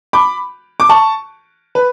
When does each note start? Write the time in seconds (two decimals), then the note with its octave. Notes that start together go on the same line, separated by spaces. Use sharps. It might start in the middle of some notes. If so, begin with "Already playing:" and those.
0.13 B5 D6
0.80 D6
0.89 A5 C#6
1.75 B4